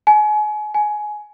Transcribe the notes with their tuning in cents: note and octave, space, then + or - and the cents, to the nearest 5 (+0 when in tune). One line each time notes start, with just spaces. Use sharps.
G#5 +30
G#5 +15